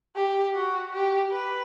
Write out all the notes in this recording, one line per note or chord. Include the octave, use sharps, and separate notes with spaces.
G4
F#4
G4
B4